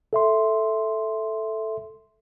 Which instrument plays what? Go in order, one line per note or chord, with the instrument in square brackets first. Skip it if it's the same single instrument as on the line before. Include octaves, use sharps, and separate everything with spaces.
[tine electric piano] A4 E5 C6